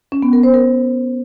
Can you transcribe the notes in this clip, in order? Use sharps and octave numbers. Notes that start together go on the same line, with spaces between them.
C#4
B3
A#4
C5
A#4